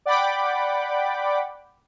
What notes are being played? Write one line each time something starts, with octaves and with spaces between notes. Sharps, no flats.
D5 F#5 G5 B5 D6